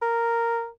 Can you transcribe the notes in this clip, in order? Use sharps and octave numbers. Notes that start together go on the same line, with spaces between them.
A#4